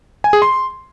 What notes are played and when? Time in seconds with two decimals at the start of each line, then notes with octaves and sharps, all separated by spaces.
0.24 G#5
0.33 G#4
0.42 C6